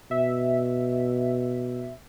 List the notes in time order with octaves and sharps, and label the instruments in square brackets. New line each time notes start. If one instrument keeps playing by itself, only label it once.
[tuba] B2 [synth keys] E5